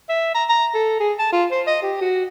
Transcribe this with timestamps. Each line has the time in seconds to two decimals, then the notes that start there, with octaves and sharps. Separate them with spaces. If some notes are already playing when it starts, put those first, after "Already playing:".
0.09 E5
0.34 A#5
0.49 A#5
0.75 A4
1.00 G#4
1.19 A5
1.33 F4
1.51 C5
1.67 D#5
1.82 G4
2.01 F#4